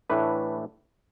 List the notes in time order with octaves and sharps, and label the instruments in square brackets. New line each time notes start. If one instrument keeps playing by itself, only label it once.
[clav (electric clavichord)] A2 E3 A3 D4 B4